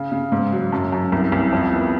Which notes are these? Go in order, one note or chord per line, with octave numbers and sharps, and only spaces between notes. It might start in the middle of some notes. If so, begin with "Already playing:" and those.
Already playing: C#3
C#3
G#2
F#3
F#2
F#2
C2
C2
F2
B3